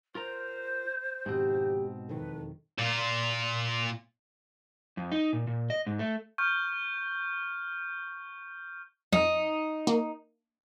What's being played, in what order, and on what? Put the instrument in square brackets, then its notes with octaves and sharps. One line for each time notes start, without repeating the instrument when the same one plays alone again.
[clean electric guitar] F4 A#4 A#5 [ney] C5
[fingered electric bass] G#1 F2 [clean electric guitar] G#2 B2 C4 [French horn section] G4
[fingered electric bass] E1 F2 D#3 [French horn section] A4 [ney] B4
[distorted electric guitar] A#2 F4
[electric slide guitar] F2
D#4
A#2
A#2
D#5
G#2
A3
[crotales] C#6 F6 G6
[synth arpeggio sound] F2 [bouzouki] D#4
[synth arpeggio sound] A#3